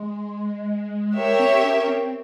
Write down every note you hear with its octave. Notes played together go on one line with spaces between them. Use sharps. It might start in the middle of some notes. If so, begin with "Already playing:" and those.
Already playing: G#3
G4 A#4 C#5 E5
C4
C#4
C4